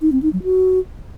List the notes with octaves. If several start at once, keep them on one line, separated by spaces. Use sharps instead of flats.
D#4
C4
D#4
F#3
F#4